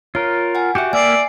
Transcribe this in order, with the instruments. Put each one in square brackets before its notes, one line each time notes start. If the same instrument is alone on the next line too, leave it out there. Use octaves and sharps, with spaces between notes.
[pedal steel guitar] F4 A#4 [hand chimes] C#5
[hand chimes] F#5 G#5
[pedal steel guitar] F#4 G4 [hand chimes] E5 G5
[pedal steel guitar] A#3 E5 [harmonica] D5 [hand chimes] G#5 C7